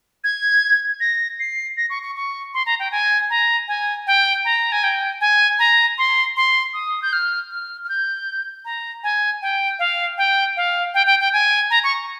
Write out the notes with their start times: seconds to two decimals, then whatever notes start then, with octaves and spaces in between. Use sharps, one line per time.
0.24 G#6
1.00 A#6
1.40 C7
1.77 A#6
1.90 C#6
2.03 C#6
2.16 C#6
2.54 C6
2.66 A#5
2.79 G5
2.91 G#5
3.30 A#5
3.68 G#5
4.07 G5
4.45 A#5
4.72 G#5
4.84 G5
5.21 G#5
5.59 A#5
5.98 C6
6.36 C6
6.74 D#6
7.02 G6
7.13 F6
7.51 F6
7.84 F6
7.89 G6
8.65 A#5
9.03 G#5
9.42 G5
9.79 F5
10.18 G5
10.57 F5
10.94 G5
11.07 G5
11.20 G5
11.33 G#5
11.70 A#5
11.84 C#6